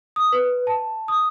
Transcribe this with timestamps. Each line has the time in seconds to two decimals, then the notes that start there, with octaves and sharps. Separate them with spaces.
0.16 D#6
0.32 B4
0.67 A5
1.08 D#6